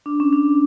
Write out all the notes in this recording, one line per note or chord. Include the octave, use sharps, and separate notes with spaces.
D4
C#4
D4